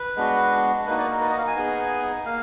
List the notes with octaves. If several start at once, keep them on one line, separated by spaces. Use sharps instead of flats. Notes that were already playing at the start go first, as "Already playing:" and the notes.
Already playing: B4
G#3 B3 D4 F#4
A#3 D#4 F#4 B4
D5
A#4
B4
D#5
F5
G#5
B3 D#4 G#4
A#3 F5